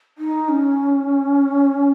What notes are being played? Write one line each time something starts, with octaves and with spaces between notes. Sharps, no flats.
D#4
C#4